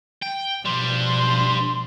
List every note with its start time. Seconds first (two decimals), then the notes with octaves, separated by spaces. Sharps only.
0.23 G5
0.65 B2 F3 G3 D4 C6